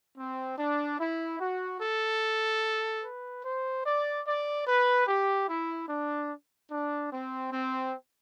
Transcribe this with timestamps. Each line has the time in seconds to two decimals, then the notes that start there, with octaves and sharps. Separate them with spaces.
0.18 C4
0.58 D4
1.00 E4
1.40 F#4
1.80 A4
3.03 B4
3.45 C5
3.86 D5
4.26 D5
4.67 B4
5.07 G4
5.49 E4
5.89 D4
6.71 D4
7.12 C4
7.52 C4